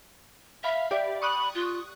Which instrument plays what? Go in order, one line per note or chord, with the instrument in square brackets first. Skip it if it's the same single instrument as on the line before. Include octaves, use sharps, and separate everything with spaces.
[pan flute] E5 [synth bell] F5 B5
[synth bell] G4 D5 [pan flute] E5
[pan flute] B5 [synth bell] C#6 D#6 F#6
[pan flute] F4